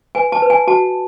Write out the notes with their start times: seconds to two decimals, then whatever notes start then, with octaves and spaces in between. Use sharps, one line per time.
0.15 B4 G#5
0.32 A5
0.42 B4
0.50 G#5
0.67 F#4 A5